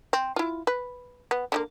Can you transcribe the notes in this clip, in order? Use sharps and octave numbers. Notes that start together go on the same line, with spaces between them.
C4
E4 F4
B4
B3
D3 G#3 A#3